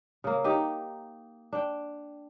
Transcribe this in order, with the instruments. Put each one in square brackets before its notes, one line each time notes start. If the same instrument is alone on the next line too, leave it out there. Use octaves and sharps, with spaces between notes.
[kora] C#3 A#3
D#4 G4 D#5
D4 G5